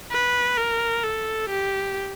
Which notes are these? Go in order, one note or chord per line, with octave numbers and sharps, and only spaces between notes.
B4
A#4
A4
G4